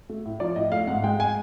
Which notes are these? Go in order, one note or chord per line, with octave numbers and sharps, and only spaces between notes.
A3
A2
F3 D5
A2 D#5
A3 F5
G#2 F#5
G#3 G5
G#5